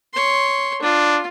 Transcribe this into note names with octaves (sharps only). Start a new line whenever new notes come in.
C#5 C6
D4 F4